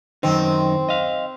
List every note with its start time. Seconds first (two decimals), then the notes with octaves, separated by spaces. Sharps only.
0.23 F#2 D#3 C4 D#4
0.89 D#5 F5